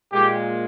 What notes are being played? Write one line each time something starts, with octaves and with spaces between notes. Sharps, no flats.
A#2 G#3 G4